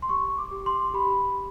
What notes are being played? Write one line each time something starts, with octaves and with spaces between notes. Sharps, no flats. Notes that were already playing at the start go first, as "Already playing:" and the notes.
C6
G4 C#6
D6
G4
C6
G4 B5